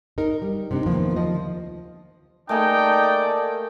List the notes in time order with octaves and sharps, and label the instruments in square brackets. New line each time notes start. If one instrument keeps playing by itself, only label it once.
[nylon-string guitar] D#4 A#4
G3
C3 D4 D#4
E2 D#3 F3 A#3
D2 F3 D#5
[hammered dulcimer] A3 A#3 G#4 [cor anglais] D#4 [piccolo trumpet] D5 [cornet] G5